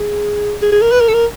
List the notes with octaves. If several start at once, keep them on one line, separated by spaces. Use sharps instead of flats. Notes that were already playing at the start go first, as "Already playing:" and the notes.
Already playing: G#4
G#4
G#4
A#4
B4
A#4
A4
A#4